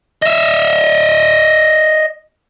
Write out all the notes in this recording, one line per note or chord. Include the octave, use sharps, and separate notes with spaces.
D#5 E5